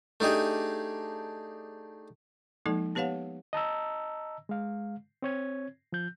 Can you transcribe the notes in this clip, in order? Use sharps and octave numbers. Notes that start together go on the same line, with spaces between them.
A3 D4 D#4 G4 G#4
F3 G#3 A#3 D#4 A4 D5
B3 G4 B4 C#5 F5 F#5
D#5 A5 A#5 E6
G#3 F5
C4 C#5 G#6
F3 G6